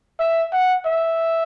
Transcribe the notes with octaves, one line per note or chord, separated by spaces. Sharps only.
E5
F#5
E5